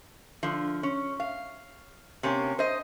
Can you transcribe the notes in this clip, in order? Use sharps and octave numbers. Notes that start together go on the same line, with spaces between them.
D3 F3
C#4
F5
C3 A#3 C#4
C5 D#5